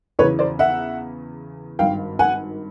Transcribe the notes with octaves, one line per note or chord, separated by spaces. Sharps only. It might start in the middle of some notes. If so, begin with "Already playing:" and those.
E2 C#3 E3 B4 C#5
C5 D5
E5 F#5
G#1 G2 D#3 F5 G5
F#5 G#5